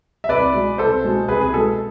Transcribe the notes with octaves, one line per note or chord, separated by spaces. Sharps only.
E5
C2 B4 D5
B2 G#3
C2 A4 C5
B2 G#3
C2 G#4 B4
G#4
B2 G#3 A4